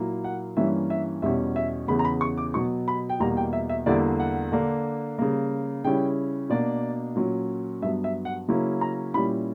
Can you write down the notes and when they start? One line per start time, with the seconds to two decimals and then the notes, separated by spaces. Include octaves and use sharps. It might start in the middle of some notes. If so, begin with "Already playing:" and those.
Already playing: A#2 F#3 A#3 E4
0.24 F#5
0.57 G2 E3 G3 A#3 C#4 E5
0.90 E5
1.22 E2 B2 G3 C#4 E5
1.56 E5
1.88 E2 C#3 E3 B3 B5
1.99 A#5
2.05 B5
2.21 C#6
2.38 D6
2.54 B2 F#3 B3 C#6
2.88 B5
3.09 G5
3.20 E2 B2 G3 A#3 A#5
3.37 G5
3.53 E5
3.69 E5
3.86 E2 D3 G3 A#3 E4 D5
4.20 F#5
4.52 D3 A#3 D4
5.18 C#3 G3 A#3
5.84 C#3 G3 C#4 E4 G5
6.49 B2 A#3 D4 D5
7.16 A#2 F#3 C#4
7.82 G2 F#3 B3 E5
8.04 E5
8.25 F#5
8.48 C#3 F#3 A#3 C#4 E4
8.81 A#5
9.14 A#2 G3 C#4 E4 B5